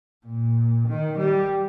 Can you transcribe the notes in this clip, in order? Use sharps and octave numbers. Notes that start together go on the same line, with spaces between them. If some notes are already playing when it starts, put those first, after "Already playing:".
A#2
D#3
G3